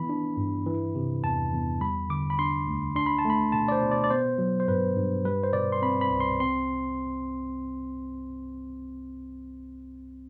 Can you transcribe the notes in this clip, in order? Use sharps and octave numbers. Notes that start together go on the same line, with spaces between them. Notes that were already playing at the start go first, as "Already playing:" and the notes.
Already playing: E3 B3 B5
D4
G2
E3
C3
E2 A5
E2
G3 B5
D3 D6
B5
D4 C6
D2
D4 C6
B5
A5
A3 B5
B2 A5
D5
C5
B2
D5
D5
B3 C5
F#3
C5
G2 B4
G2
G3 B4
C5
B2 D5
C6
C4 B5
B5
C2
C6
C4 C6